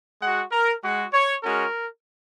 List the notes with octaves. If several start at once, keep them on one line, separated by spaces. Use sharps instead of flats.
G#3 F#4 F#5
A#4
G#3 F#4
C#5
G#3 C#4 F#4 A#4